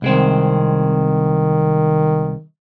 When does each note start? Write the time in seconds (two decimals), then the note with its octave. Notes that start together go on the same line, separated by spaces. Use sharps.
0.02 C2 D#3 G#3 C4